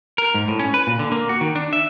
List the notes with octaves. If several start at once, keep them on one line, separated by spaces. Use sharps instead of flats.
A#4
G#2
A2
C#4
B4
A#2
D3
A#3
F#4
D#3
D4
E5